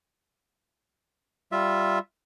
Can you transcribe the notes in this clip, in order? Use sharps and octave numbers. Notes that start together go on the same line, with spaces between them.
G3 F4 E5